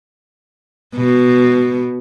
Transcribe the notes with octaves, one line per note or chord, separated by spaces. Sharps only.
B2